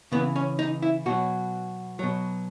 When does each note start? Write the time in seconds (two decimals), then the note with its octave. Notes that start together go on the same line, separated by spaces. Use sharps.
0.12 C#3 E3 B3
0.36 C#4
0.59 D#4
0.82 E4
1.06 B2 F#3 F#4
1.99 B2 F#3